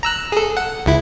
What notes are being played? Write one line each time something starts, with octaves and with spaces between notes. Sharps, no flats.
A#5 E6 F#6
G#4 A4
F#5
C#2 E4